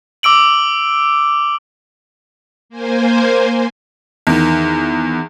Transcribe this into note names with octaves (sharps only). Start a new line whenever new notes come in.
D6 E6 D7 F#7
A#3 C5 G#5
E2 D#3